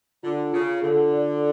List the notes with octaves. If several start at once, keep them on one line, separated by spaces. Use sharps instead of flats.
D3 F4
C#3 F4
D3 A4
D5